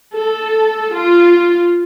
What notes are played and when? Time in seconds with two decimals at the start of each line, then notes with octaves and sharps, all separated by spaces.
0.11 A4
0.93 F4